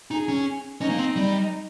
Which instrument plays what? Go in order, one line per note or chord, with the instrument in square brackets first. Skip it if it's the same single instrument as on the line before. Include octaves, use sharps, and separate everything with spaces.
[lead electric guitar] D#4 [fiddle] G#4
[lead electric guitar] C#4
[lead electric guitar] C#4 [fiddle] D#4
[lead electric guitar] A#3
C4
G3